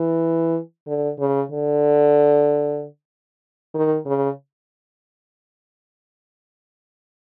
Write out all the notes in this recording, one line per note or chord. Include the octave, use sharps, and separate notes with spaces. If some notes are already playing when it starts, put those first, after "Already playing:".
Already playing: E3
D3
C#3
D3
D#3
C#3